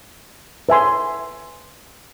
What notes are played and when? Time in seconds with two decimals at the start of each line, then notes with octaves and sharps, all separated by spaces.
0.69 B4 E5 G#5 C6